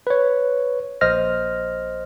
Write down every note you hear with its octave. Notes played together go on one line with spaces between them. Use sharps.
B4 C#5
A#1 C5 D#5 F6 A#6